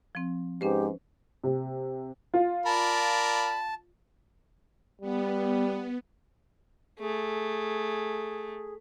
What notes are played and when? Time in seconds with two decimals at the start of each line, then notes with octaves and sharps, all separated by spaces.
0.15 F3 C4
0.61 G#2 C#4 G4 B4 C5
1.44 C3
2.34 F4
2.66 A#4 D5 A5 B5
5.01 G3 B3
7.00 A3 G#4